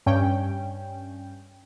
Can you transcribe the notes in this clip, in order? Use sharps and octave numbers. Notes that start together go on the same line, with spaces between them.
G2 C#4 G5